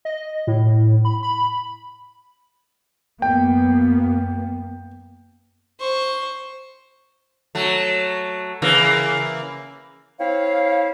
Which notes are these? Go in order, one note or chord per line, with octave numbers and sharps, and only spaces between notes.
D#5
A2
B5
B5
F#2 A#3 B3 G5
C5 C#6
F#3 A3
C#3 E3 A#3
C4 E4 C#5 F5